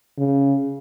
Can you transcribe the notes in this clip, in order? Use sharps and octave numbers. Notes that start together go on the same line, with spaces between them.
C#3